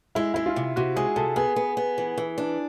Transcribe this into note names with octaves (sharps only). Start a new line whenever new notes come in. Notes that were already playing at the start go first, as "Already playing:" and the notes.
G#3 E4
G#3 E4
F4
C3
C3 F#4
G#3 G#4
C3 A4
B3 G#4
B3
B3
E3
E3
D4